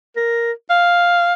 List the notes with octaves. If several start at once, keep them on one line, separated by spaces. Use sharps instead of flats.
A#4
F5